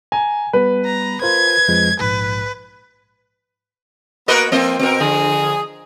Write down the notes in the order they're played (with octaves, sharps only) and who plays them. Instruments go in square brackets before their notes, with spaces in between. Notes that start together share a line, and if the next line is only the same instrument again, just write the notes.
[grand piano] G#5 [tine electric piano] A#5
[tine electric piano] G3 B3 [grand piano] B4
[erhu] A#5
[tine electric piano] F4 A#4 C5 [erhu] G#6
[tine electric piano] F2 F3 G#3
[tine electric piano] A#1 G#2 [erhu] B4
[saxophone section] A#3 B3 F#4 [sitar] A#4 B4 D#5
[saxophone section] F3 A#3 [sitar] C4 D#5
[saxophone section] B2 [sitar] C4 A#4
[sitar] D3 [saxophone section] F3 G#4